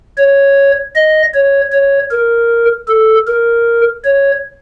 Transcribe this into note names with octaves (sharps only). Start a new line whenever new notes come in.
C#5
D#5
C#5
C#5
A#4
A4
A#4
C#5